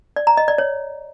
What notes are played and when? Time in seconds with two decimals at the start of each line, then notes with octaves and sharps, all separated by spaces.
0.16 D5
0.27 A#5
0.37 D#5
0.48 D5
0.58 C#5